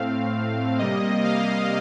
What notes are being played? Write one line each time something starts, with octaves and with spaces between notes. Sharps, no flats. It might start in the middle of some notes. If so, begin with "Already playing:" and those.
Already playing: A2 A3 C4 F5
C3 G3 A#3 D#5
F5